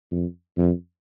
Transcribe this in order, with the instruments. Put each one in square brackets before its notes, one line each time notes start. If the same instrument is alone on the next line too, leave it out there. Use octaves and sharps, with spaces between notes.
[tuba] F2
F2